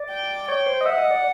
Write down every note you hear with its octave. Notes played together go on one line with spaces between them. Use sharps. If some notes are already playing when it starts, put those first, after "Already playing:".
Already playing: D5
G5
C#5 G5
C5
D#5
E5 F#5
D#5
D5